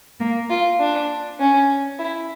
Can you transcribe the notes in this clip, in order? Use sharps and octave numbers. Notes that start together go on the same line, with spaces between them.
A#3
F4
D4
C#4
E4